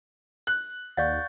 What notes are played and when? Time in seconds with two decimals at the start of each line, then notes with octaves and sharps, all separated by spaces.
0.47 F#6
0.97 D#2 D5 F5 F#5 C#6 G6 A6